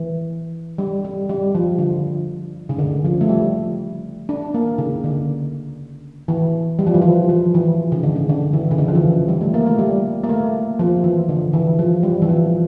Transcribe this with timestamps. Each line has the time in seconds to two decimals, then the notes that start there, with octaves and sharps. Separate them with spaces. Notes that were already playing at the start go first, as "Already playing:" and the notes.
Already playing: E3
0.78 G3
1.04 G3
1.29 G3
1.55 F3
1.78 D3
2.69 C#3
2.79 D3
3.05 F3
3.21 A3
3.29 G3
4.29 D4
4.54 A#3
4.78 C#3
5.04 D3
6.28 E3
6.79 G3
6.87 F3
6.94 E3
7.02 F3
7.29 F3
7.54 E3
7.92 C#3
8.03 D3
8.16 C#3
8.29 D3
8.53 E3
8.71 C#3
8.78 D3
8.88 F3
8.95 E3
9.28 G3
9.41 A3
9.54 A#3
9.66 A3
9.79 G3
10.24 A#3
10.29 A3
10.79 F3
11.04 E3
11.29 D3
11.53 E3
11.79 F3
12.03 G3
12.22 E3
12.29 F3